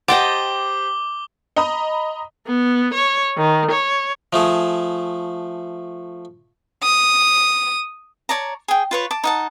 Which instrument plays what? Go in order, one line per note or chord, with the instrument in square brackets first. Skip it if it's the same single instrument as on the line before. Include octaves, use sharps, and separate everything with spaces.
[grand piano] G4 C5 [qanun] D#5 G5 A5 [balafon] F#5 [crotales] D6 G7
[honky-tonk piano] D#5 A#5 B5 D#6
[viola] B3
C#5
D#3
C#5
[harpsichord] F3 A3 G#4
[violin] D#6
[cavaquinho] C#5 D5 A5 A#5
G#4 G5
F4 B4 C#5
A5 D6
D#4 F#5 A5